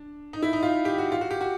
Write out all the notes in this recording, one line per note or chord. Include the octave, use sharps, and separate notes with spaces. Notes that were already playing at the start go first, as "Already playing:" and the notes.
Already playing: D4
D#4
E4
D#4
F4
G4
F#4
F4
F#4
G4
F#4